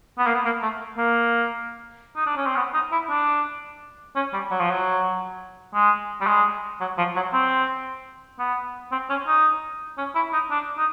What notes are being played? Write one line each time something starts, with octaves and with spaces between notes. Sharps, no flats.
B3
A#3
B3
A#3
A3
A#3
D#4
D4
C#4
C4
B3
D#4
E4
D4
C#4
G3
F#3
F3
F#3
G#3
G3
G#3
F#3
F3
F#3
C4
B3
C4
C#4
D#4
C#4
E4
D#4
D4
D#4